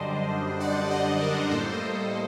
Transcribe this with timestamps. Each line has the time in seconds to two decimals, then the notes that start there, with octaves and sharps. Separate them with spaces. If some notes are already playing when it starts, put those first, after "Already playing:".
Already playing: F#2 D3 G3 D4 C5 D#5
0.60 D5 F#5
0.91 C5 D#5
1.21 A#4 D5
1.43 D5
1.51 A2 G3 A#3 A4 C5
1.74 C5 D#5